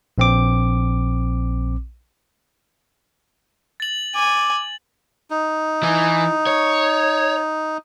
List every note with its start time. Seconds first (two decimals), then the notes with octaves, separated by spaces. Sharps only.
0.18 A#1 C4 D6
3.80 A6 F#7
4.15 G#5 D6
5.30 D#4
5.83 E3 E4
6.47 C#5